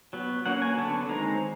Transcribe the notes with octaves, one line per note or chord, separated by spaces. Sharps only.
F#3 B3
F#3 A#3 C#4 F#5
G#5
D3 F#3 B3 A5
D#3 G#3 C4 A#5